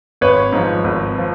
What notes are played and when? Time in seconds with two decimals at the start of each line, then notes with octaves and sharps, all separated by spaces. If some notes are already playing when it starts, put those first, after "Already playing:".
0.21 G#1 B4 C#5
0.52 G#2 F3
0.84 G#1
1.18 F3